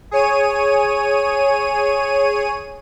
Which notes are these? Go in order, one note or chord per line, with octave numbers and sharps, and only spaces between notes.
G#4 C#5 D#7